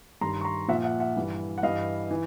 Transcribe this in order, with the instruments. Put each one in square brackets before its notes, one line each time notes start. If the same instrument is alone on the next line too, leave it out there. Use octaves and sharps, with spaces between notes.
[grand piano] G2 D#3 A#5 C6
C#6
A#5 C6
A#2 F3 E5 F#5
E5 F#5
E5 F#5
G2 E3
F#5
G2 E3 D#5 F5
E3